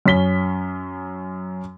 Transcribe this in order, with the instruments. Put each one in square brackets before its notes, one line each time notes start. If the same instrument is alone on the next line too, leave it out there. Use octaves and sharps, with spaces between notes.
[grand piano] F#2 C#4 B6 G7